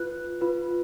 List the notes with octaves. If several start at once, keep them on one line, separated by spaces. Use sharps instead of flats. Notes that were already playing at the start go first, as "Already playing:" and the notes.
Already playing: F4 B4 F#6
F4 B4